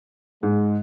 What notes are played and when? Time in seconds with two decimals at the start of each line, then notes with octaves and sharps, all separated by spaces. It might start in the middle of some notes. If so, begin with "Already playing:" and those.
0.43 G#2 G#3